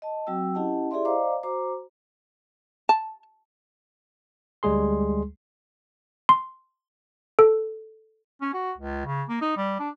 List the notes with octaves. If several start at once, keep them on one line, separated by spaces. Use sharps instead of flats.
D#5 A5
F#3 C4 F#4 G5 E6
C#4 E4 G4 D#5 F#5 A5
E4 G4 G#4 D5 E5 C6
C5 D5 D#5 F5 A#5 D6
F#4 C5 A#5 D6
A5
D2 G3 G#3 G#4 C6
C6
A4
C#4
F#4
C#2
C#3
A#3
D#4
G3
D4